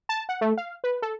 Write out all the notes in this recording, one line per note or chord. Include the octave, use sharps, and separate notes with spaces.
A5
F#5
A3
F5
B4
A4